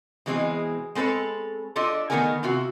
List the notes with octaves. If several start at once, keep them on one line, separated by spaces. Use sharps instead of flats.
B2 E3 G#3 C4 D#4 G#4
G#3 C4 A4 B4 C#5
D4 F4 G4 A4 D#5
D#3 A3 B3 D#4 A#4 G#5
C3 F4 F#4 E5